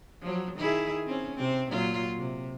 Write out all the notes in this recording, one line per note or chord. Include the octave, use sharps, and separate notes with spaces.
F3 F#3
D#3 E4 G#4
C4 C#4
C3 C4
A#2 F#3 F4
C3